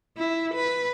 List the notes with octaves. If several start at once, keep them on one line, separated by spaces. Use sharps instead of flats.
E4
B4